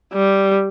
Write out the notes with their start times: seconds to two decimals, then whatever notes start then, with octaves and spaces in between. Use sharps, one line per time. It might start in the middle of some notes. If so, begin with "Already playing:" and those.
0.13 G3